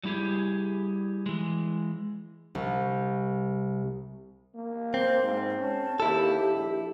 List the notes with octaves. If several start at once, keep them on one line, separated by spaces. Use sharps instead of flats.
F#3 G3 E4 G4 G#4
E3 G#3
C2
A#3
C4 C5
G#2
C#4 A5
D#2 E4 G4 A4
A#1